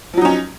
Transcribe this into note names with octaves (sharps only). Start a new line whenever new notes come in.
F3 F#3 C#4 D#4